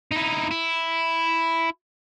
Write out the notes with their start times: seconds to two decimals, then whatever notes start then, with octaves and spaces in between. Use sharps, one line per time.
0.11 D#4 E4
0.51 E4